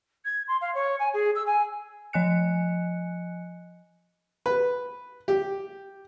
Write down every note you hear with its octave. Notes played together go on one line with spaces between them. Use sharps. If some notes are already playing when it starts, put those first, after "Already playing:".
G#6
C6
F5
C#5
G#5
G#4
E6
G#5
F3 D#5 G#5 F#6 C#7
B4
G4